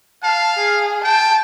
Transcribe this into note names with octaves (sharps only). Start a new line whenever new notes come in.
F5 A5
G#4
G5 A5